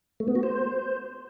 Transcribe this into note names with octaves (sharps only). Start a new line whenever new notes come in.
A3
B3
F#4
C5